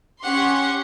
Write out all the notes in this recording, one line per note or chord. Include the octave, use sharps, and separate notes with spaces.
C#4 G4 F#5 C6